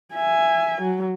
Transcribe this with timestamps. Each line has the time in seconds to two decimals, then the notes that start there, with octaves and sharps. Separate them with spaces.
0.14 E5 G#5
0.81 F#3